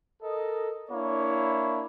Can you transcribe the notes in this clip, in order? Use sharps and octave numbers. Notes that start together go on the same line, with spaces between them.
A4 A#4 D#5
A#3 D4 E4 C#5